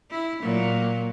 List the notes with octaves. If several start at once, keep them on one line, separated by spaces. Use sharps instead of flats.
E4
A#2 F#3 A#3